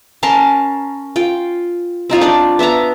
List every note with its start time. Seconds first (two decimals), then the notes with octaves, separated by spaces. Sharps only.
0.23 C#4 A#4 A5 C6
1.16 F4 G5
2.10 C4 D#4 F4 C#5
2.21 D4 D5
2.59 B3 E5 A5 A#5